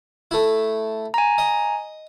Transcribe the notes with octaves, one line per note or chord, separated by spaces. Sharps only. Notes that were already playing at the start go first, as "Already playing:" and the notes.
A3 E4
G#5 A#5
D#5